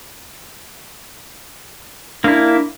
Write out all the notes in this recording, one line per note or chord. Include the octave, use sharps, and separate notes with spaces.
A#3 D4 E4